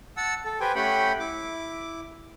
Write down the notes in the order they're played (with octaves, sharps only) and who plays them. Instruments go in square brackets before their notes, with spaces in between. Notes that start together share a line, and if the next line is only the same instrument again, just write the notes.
[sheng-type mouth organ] F#5 A5 E6
A4
G4 B4 C5 G5 G#5
A3 C#4 G4 F#5 G5 B5
E4 D6